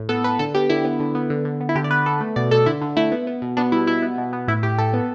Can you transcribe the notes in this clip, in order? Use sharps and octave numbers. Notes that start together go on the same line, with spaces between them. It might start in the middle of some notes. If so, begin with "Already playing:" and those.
Already playing: A2
B3 A4
A2 B4
D3 A4
B3 G4
D3 E4
B3
D3
B3
D3
D3
B3
E4
D3 G4
D5
B3 B4
B3 A4
A3
B2 D5
B2 A4
D3 E4
D3
A3 E4
B3
B3
B2
B3 D4
G3 E4
B2 E4
B3
B2
B3
A2 E4
A2 G4
A2 A4
B3